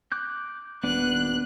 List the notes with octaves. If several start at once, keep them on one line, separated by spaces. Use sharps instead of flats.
D6 F#6 G6
D#1 B3 D4 B4 F#6